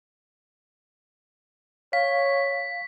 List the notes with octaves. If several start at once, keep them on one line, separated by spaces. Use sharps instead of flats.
C#5 F5 B6